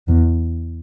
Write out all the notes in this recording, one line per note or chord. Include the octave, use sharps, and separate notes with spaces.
E2